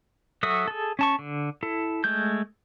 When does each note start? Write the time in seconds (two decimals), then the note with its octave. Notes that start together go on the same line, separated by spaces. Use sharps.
0.43 F#3 F#4 A4 E5 D#6
0.68 G#4 A4
0.99 C#4 A5 C#6
1.19 D3
1.63 E4 A4
2.04 G#3 A3 G6